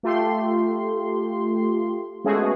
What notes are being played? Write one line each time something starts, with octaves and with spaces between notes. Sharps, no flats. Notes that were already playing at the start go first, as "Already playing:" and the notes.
A3 F4 G4 C6
G#3 A3 B3 C#4 F#4 G#4